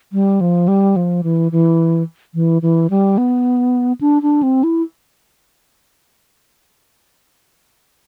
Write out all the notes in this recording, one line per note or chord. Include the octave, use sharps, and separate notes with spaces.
G3
F3
G3
F3
E3
E3
E3
E3
G3
B3
D4
D4
C4
E4